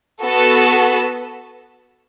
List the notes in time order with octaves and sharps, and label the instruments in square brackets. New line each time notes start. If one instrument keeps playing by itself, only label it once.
[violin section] B3 F#4 A4